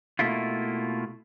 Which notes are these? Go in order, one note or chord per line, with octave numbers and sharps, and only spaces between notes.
B2 A3 A#3 E4 F4